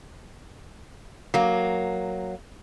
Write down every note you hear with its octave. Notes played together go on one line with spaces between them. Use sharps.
F#3 A#3